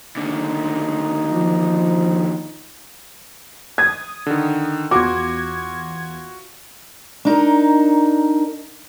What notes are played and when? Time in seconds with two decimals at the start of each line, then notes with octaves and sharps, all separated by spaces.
0.16 D#2 D3 D#4
1.32 F3
3.78 D#6 G#6
4.26 D3 D#3
4.91 E2 F4 F#4 D6 G#6
7.25 D4 D#4 A#4